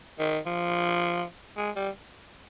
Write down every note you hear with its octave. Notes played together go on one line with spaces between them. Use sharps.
D#3
F3
G#3
G3